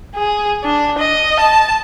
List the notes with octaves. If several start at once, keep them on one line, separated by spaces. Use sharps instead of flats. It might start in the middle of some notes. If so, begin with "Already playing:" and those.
G#4
D4
D#5
A5